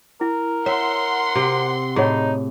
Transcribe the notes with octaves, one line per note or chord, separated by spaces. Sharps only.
E4 A#4
C#5 E5 F#5 C6
C3
A2 D#4 G#4 C#5